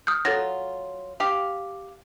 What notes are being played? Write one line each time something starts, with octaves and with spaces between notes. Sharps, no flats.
D#6 F6 G6
F#3 F4 A4 A6 A#6
G4 F5